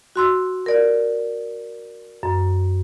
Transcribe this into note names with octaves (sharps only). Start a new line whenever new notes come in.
F#4 C6 E6
A#4 D5
F#2